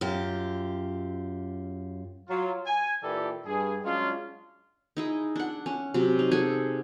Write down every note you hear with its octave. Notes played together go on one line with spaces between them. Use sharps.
F#2 F4 G4
F#3 F4
G#5
A#2 E3 D4 G4 A4 D5
G2 G#4
F#3 G#3 C#4 D4 F4
D#4 E4 G#4
D4 F#5
C#4
C3 F#3
D#4
G#4 A4 F#5 G#5